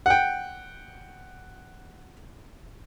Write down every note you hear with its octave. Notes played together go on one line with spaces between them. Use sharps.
F#5 G5